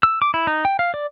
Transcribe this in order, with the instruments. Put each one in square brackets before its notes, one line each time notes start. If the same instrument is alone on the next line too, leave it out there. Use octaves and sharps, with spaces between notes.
[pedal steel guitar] E6
D6
E4
D#4
G5
F5
D5